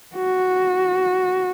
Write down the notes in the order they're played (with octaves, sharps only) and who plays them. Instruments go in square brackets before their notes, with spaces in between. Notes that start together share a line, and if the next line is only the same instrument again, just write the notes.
[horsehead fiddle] F#4